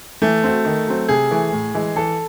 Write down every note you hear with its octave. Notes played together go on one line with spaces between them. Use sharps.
E3 A3
C4 F#4
D#3
F#3 C4
C3 G#4
E3 A3
A2
E3 G#3
E3 A4